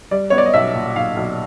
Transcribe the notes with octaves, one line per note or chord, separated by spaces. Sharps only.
G3 D5
B3 C#5
D5
D#5
B1 E5
A#2
B1 F5
B1